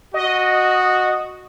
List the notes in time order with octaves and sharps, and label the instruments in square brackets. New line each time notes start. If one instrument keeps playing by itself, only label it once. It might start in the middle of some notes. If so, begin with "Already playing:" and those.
[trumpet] F#4 [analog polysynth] D#5